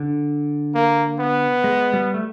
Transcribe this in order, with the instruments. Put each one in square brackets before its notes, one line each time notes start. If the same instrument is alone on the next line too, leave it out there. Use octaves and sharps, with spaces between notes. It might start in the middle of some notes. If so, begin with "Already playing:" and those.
Already playing: [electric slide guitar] D3
[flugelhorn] A#3
B3
[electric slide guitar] G#3
G3
A3